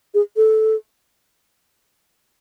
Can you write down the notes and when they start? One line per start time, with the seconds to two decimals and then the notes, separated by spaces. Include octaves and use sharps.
0.14 G#4
0.37 A4